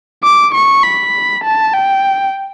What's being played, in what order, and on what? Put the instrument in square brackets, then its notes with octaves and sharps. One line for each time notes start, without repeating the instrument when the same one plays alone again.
[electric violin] D6
C#6
B5
A5
G5